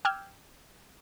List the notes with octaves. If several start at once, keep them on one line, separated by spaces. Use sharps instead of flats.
G5 D6 E6 F6 G6 G#6